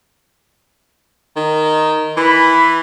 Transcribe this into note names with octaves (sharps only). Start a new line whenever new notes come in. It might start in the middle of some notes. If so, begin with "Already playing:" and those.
D#3
E3 B5